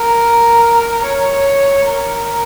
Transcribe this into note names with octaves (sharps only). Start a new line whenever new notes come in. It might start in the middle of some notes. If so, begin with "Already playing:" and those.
Already playing: A#4
C#5
A#4